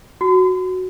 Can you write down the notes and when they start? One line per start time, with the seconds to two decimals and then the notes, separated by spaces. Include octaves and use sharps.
0.21 F#4